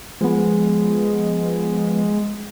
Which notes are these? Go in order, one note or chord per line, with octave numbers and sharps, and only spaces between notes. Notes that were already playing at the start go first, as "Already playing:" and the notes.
F3 G#3 B3